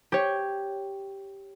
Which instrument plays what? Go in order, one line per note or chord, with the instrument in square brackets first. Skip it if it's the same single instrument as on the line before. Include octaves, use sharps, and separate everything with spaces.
[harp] G4 C#5